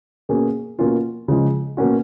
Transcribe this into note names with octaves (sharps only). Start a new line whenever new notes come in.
B2 A#3 C#4 G#4
B2 A#3 C#4 F4
C#3 F3 G#3
B2 A#3 C#4 F#4